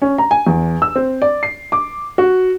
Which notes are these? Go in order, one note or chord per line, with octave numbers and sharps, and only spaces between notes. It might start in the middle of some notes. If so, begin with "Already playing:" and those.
C#4
A#5
G#5
E2
E6
C4
D5
C7
D6
F#4